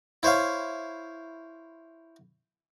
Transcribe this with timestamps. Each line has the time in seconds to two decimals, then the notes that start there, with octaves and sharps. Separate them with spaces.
0.23 E4 C5 C#5 F5